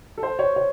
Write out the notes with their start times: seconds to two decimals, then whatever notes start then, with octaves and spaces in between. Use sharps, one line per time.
0.18 A4
0.23 C5
0.39 C#5
0.56 C#5